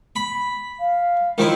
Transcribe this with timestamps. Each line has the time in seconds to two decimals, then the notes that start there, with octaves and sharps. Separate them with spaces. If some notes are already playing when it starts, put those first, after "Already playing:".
0.16 B5
0.79 F5
1.38 D#3 F3 E4